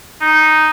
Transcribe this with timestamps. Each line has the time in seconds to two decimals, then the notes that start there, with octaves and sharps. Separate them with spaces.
0.21 D#4